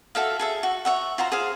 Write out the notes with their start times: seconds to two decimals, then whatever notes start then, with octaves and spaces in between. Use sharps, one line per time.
0.15 F#4 A4 E5 F5
0.39 G#4 A4 E5
0.63 F#4
0.85 C#5 E5 F#5
1.18 F4 F#4 C5 A#5
1.32 G#4 C5 F5